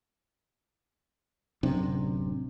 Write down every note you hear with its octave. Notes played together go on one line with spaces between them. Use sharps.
D1 F#2 C3 D4